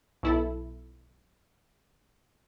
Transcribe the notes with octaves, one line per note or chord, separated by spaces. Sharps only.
B1 E4 A4